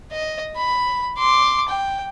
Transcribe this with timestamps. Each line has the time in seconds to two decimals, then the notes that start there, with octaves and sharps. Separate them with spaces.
0.12 D#5
0.56 B5
1.18 C6 D6
1.69 G5